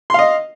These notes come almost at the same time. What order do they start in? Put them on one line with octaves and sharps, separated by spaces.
C6 F5 D#5